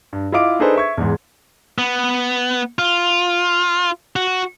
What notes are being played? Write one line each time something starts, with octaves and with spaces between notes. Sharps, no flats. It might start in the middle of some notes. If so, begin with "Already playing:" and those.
G2
E4 F4 D#5 F5 D6 D7
D4 D#4 G#4 A4 B4 C5
E5 C#6 G#6
E2 G#2
B3
F4
F#4